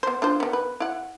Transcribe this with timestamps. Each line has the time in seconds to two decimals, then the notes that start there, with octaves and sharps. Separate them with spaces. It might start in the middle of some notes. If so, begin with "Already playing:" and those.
0.03 B3 C5
0.22 D4 F4 C5
0.40 D#3 B3
0.53 B4
0.80 E4 F#5